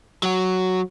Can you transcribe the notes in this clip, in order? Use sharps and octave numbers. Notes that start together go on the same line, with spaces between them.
F#3 F#4